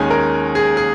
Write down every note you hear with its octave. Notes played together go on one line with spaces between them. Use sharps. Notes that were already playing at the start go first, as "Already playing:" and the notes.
Already playing: D#2 D#3 G#3 C#4 G#5
A#4
G#4
G#4